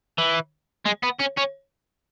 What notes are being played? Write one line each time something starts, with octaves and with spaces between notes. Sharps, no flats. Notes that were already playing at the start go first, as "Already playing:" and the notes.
E3
G#3
B3
C#4
C#4